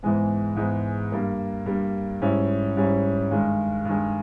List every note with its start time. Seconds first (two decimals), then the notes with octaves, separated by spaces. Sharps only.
0.03 G#2 E3 G#3 B3
0.57 G#2 E3 G#3 B3
1.12 G2 G3 A#3
1.66 G2 G3 A#3
2.22 G#2 G3 C#4 E4
2.77 G#2 G3 C#4 E4
3.31 G2 D#3 G#3
3.85 G2 D#3 G#3